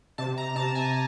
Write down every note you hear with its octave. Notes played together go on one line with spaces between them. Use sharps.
C3 A5
A#5
C3 A5
G#5